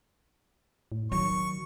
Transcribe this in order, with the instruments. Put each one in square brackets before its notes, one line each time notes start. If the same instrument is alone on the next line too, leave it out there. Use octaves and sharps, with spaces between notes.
[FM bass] A2
[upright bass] D#3 [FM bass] F#3 [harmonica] C#6